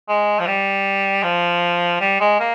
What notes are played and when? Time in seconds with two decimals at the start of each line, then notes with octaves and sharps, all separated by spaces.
0.08 G#3
0.39 F3
0.47 G3
1.23 F3
2.00 G3
2.20 G#3
2.40 A#3